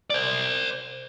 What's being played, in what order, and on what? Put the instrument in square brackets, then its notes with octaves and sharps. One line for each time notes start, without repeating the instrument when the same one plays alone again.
[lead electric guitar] C5 D5